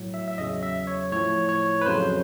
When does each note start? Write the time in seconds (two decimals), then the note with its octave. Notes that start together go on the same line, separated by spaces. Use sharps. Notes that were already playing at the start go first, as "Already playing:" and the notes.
Already playing: A2 F#3
0.14 E5
0.28 E5
0.38 E2 C#3 F#3 D#5
0.63 E5
0.87 C#5
1.12 A2 F3 C#5
1.49 C#5
1.81 B4
1.86 F2 C#3 F#3 C5